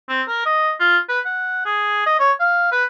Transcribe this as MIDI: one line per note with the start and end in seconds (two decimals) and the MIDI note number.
0.09 0.22 60
0.27 0.45 70
0.46 0.72 75
0.80 0.98 65
1.09 1.20 71
1.25 1.61 78
1.65 2.05 68
2.06 2.16 75
2.19 2.33 73
2.40 2.71 77
2.72 2.84 71